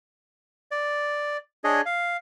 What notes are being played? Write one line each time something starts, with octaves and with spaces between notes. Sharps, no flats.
D5
D4 G#4 C#5 D#5
F5